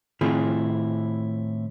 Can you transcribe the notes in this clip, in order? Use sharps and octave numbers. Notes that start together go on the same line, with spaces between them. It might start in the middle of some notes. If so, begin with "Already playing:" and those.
A2 D#3 C4 E4 F4 G#4